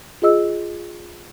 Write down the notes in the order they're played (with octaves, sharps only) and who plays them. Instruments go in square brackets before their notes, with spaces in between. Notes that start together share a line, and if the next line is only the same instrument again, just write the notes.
[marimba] F4 G#4 D#5 E6